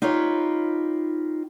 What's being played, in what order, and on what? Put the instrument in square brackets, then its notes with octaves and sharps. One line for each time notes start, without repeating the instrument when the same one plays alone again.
[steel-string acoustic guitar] D#4 F4 G4 B4 C#5